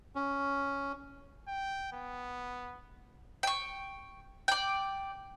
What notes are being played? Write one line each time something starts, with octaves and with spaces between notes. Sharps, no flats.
C#4
G5
B3
G5 C#6
D5 G5